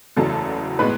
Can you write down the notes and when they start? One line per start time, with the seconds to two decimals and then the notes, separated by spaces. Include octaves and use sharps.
0.16 F#1 E2 C#3 F#3 A3 A4 A5
0.79 A2 G#3 B3 B4 B5